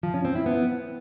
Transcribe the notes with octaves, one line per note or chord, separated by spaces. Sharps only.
F3
C#4
C4
E4
B3